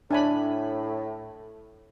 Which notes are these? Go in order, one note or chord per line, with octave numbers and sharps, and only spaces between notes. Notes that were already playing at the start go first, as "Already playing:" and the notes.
A2 D4 G#5 B5